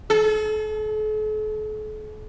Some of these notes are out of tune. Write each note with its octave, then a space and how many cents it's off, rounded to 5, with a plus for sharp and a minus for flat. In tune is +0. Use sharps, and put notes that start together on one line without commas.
A4 -45